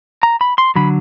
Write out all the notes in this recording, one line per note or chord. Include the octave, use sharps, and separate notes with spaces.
A#5
B5
C6
D3 F#3 B5